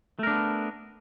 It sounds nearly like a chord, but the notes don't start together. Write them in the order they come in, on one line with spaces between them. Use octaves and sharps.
A3 A#4 D4 B3